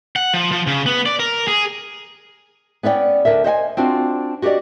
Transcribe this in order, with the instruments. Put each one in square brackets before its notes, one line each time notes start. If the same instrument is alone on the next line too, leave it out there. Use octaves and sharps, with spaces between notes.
[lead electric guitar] F#5
F3
F3
C#3
B3
D5
A#4
G#4
[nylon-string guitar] B3 C#4 D5 E5 G5
D2 G2 D3 A#4 E5
C5 D#5 F#5 G#5
C4 D4 F4 F#4
F#4 G4 A#4 D5 D#5